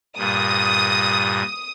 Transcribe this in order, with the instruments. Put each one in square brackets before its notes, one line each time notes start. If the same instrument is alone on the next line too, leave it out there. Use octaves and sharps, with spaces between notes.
[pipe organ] G2 A#2 [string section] D#6